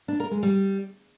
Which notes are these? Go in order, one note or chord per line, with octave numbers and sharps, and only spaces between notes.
D4
A#4
G#3
G3